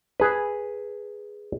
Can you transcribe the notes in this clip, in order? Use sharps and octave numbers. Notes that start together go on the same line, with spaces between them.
G#4 B4